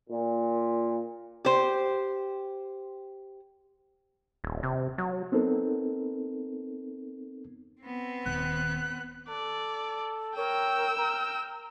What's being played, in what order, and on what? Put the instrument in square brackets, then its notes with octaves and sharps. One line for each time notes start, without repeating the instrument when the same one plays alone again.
[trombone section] A#2
[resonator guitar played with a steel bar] G4 C5
[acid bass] D#1
C3
F#3
[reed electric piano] B3 C4 D#4 A4 A#4
[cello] B3 C4
[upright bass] D#1 D#3 [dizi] F#6
[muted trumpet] A4 [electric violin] D5
[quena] A#4 [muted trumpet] C#5 [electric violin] G5 E6
[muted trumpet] A#4 [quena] A#5